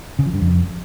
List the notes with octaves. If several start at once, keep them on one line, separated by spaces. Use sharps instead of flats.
C#3
F3
G2
F2